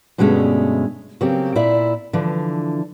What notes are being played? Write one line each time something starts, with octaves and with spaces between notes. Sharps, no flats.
G2 B2 D3 G#3 A3 C#4
C#3 F#3 A#3 C4 G4
A#2 E4 D5 E5
D3 E3 F3